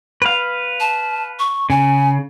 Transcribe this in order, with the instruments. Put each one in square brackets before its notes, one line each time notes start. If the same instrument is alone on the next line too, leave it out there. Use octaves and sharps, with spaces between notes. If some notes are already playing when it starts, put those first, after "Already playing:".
[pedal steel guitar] B4 F5
[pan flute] A5
C#6
[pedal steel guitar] C#3 [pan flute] G#5